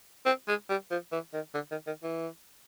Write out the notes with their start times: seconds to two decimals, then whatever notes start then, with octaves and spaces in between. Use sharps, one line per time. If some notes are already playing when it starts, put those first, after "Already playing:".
0.26 C4
0.48 G#3
0.69 G3
0.90 F3
1.12 E3
1.33 D#3
1.54 D3
1.71 D#3
1.87 D#3
2.03 E3